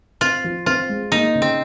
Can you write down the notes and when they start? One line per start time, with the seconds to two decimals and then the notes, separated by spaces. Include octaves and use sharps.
0.21 C4 F4
0.44 F3
0.66 C4 F4
0.89 G#3
1.12 A#3 D#4
1.35 C#3
1.42 C4